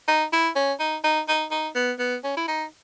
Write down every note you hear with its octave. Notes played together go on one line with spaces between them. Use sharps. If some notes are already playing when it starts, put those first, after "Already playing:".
D#4
E4
C#4
D#4
D#4
D#4
D#4
B3
B3
C#4
E4
D#4